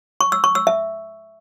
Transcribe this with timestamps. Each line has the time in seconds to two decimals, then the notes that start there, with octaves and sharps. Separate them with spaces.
0.21 C#6
0.32 E6
0.44 C#6
0.55 E6
0.67 E5